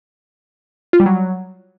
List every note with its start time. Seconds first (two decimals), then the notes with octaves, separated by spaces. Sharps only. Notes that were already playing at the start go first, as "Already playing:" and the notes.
0.93 F4
1.00 G3
1.06 F#3